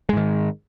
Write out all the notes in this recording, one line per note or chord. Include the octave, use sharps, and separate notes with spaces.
G#2 D#3 G#3